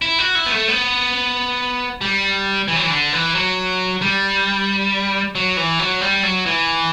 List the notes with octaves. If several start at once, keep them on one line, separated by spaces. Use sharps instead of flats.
E4
F#4
E4
B3
A3
B3
G3
E3
F#3
E3
D3
E3
F#3
G3
F#3
E3
F#3
G3
F#3
E3